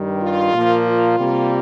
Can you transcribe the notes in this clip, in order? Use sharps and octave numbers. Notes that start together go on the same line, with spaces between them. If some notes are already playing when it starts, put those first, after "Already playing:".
Already playing: G2 D#3 G3
F4
A#2 F3 A#3
F4
C3 G3 A#3